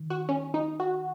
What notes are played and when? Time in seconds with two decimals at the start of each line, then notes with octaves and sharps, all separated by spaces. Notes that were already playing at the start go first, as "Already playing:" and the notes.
Already playing: D#3
0.10 F#4
0.29 C#4
0.54 D#4
0.80 F#4